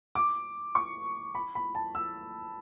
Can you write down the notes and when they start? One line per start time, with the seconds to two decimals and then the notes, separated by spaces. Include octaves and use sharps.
0.15 D6
0.75 C#6
1.35 B5
1.55 B5
1.75 A5
1.95 E6